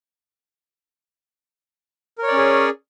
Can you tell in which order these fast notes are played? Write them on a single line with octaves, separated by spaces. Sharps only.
A#4 C#5 D5 C#4 G#4